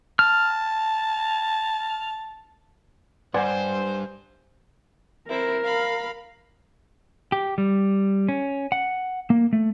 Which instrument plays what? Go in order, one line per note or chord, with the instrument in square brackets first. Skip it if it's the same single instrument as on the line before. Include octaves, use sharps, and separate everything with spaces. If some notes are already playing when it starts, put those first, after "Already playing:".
[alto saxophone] A5 [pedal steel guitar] F6
[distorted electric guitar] G2 [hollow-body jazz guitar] B4 F#5 C6 [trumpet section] C5 [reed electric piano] D5 G#5
[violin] C4 E4 [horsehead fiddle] A#4
[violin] F5 B5
[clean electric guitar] G4
G3
C#4
F#5
A#3
A3